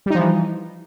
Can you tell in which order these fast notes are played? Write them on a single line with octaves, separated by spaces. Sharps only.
G3 D#4 F3 E3